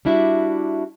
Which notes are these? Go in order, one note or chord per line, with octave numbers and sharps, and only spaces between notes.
G3 D4 E4 F#4 E5